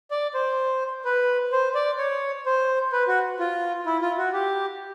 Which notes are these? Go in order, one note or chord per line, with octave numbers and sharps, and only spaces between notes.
D5
C5
B4
C5
D5
C#5
C5
B4
F#4
F4
E4
F4
F#4
G4